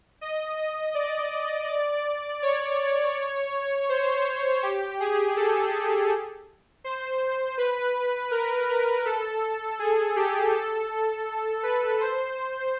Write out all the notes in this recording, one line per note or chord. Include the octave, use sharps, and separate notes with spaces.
D#5
D5
D5
C#5
C5
G4
G#4
A4
C5
B4
A#4
A#4
A4
G#4
G4
A4
B4
C5